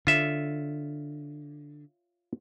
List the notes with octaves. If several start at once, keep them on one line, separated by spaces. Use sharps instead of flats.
D3 F4 C#5 E5